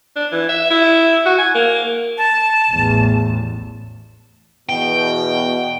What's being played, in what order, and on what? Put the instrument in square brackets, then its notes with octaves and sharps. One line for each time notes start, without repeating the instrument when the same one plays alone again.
[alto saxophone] D4
E3
E5
E4
F#4
G#5
A#3
[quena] A5
[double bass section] A1 E2
[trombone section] E2 B2 [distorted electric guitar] G5